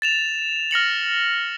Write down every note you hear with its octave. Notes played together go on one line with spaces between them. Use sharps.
A6 E7 F7
F6 A#6 C#7 F#7